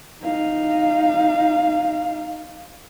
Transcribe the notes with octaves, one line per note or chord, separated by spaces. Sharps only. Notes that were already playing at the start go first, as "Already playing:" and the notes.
D#4 F5